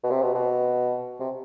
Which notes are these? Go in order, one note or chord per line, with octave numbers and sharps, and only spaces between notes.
B2
C3
B2
B2
C3